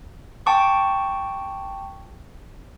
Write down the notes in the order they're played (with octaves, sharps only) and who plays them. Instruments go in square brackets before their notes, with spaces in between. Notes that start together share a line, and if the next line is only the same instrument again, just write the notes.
[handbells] G5 A5 C#6 D6